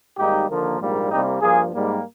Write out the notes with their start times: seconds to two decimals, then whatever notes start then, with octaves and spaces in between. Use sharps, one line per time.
0.18 G#1 G#2 G3 A#3 D#4 G4
0.50 D#2 D3 F3 A#3
0.80 A#1 G#2 G3 A#3
1.10 C2 C3 G3 A#3 D#4 G4
1.41 G2 F3 A#3 F4 G#4
1.72 G#2 G3 A#3